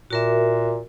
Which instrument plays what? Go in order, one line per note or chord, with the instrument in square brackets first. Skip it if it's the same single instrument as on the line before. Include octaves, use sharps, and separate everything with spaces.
[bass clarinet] A#2 [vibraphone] F#4 A#4 E5